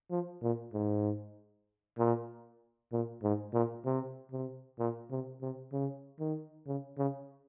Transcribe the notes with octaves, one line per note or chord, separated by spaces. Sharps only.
F3
A#2
G#2
A#2
A#2
G#2
A#2
C3
C3
A#2
C3
C3
C#3
D#3
C#3
C#3